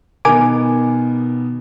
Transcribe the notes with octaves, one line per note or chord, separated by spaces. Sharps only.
B2 D#3 B3 A#4 G#5 D6